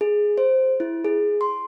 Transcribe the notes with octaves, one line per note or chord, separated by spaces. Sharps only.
G#4
C5
E4
G#4
C6